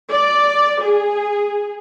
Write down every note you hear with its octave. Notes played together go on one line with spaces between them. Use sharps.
D5
G#4